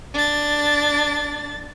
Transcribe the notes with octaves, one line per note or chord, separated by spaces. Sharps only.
D4 A6